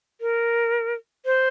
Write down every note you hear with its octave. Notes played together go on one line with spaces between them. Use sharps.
A#4
C5